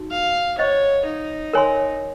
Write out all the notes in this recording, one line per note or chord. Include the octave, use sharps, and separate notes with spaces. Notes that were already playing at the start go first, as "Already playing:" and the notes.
Already playing: D#4 F#4
F5
C5 C#5 D#5 F#5 C#6
D#4
A#4 C#5 G#5 C6